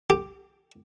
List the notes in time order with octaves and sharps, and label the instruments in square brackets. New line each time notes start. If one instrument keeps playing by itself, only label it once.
[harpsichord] G4